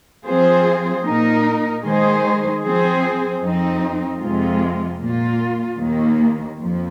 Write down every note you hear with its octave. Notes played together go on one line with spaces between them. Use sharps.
F3 C4 F4 G#4 C5
A#2 A#3 D#4 A#4
D#3 G#3 D#4 G#4 C5
F3 C4 G#4 C5
F2 F3 C4 D#4
F2 C3 G#3 F4
A#2 A#3 F4
D#2 D#3 A#3
F2 F3